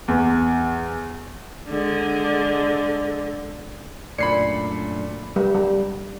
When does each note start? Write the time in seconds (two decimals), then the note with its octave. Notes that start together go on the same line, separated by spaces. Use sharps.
0.08 E2
1.68 D3 G#3
4.18 F#2 A#2 A3 D4 D5 B5 C7 C#7
5.36 G3
5.54 G3